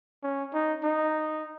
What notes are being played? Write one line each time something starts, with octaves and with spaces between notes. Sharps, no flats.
C#4
D#4
D#4